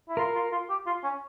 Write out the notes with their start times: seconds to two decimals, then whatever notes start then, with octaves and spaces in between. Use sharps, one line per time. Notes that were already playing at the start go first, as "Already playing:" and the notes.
0.08 E4
0.17 F4 A#4
0.35 F4
0.52 F4
0.69 G4
0.86 F4
1.03 C#4